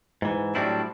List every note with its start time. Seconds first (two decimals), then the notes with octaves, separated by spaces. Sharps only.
0.22 G#2 E3
0.55 A2 F#3 G3 C4 D4 E4